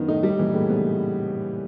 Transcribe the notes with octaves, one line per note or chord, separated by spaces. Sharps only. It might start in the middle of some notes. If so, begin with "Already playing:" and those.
Already playing: F#2 D#3 B3
A2 A3 D#4
A2 G3 A3
A#2 E3 A#3
A2 C#3 A3
G#3 B3